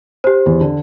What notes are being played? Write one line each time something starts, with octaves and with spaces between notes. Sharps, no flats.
G4 C5
E2
D3